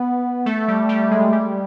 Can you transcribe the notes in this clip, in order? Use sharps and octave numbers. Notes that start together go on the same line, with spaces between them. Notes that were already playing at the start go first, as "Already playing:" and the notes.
Already playing: B3
A3
G3
G3
G#3
G3